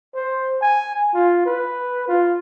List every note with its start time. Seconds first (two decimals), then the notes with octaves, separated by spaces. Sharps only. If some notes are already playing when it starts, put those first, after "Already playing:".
0.14 C5
0.62 G#5
1.14 F4
1.46 B4
2.08 F4